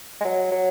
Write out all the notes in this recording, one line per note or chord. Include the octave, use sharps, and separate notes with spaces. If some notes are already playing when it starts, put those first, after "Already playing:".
G#3
F#3
F#3